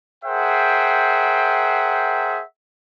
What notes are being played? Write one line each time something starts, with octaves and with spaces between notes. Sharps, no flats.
G#4 A#4 C5 E5 F#5 G5